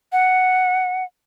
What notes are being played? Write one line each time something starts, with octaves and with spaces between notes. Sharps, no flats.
F#5